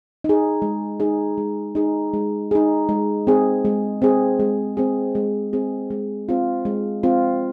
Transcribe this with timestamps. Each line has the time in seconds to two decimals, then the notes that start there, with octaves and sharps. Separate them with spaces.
0.24 D#4 G#4
0.62 G#3
1.00 D#4 G#4
1.38 G#3
1.75 D#4 G#4
2.14 G#3
2.51 D#4 G#4
2.89 G#3
3.27 C4 G#4
3.65 G#3
4.02 C4 G#4
4.40 G#3
4.77 C4 G#4
5.15 G#3
5.53 C4 G#4
5.91 G#3
6.29 C4 F4
6.65 G#3
7.03 C4 F4